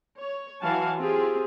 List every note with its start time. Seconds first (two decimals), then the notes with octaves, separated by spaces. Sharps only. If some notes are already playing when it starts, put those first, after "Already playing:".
0.17 C#5
0.61 E3 F#3 F5 F#5 G#5 A5
0.98 C4 F4 G4 G#4